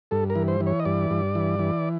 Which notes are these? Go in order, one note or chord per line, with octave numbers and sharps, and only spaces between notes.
G2 A4
A#4
E3
C5
E3
C#5
D#5
G2 D5
G2
E3
E3